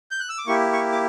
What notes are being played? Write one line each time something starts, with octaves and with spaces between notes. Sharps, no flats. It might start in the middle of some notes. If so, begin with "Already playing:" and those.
G6
F#6
E6
D6
A#3 E4 G4 C#6
C#6
D6